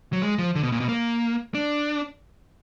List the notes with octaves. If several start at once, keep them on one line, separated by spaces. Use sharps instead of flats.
F#3
G#3
F3
D3
B2
A#2
B2
A#3
D4